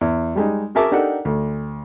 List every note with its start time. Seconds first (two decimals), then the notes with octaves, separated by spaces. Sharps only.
0.01 E2
0.35 G3 G#3 D#4
0.75 F#4 G#4 A#4 E5 A5 D6
0.91 D4 D#4 G4 A4 A#4 F#5
1.25 D2